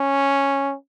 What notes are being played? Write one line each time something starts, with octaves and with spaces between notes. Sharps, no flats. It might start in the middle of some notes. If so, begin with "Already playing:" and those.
Already playing: C#4